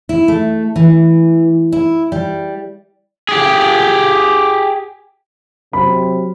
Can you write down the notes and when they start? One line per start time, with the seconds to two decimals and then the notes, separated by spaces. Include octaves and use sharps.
0.09 E4
0.28 A3
0.76 E3
1.72 E4
2.12 G3
3.29 G4 G#4
5.73 C3 F#3 B5